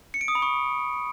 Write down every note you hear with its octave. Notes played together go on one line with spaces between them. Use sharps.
C#7
D7
D#6
B5
C#6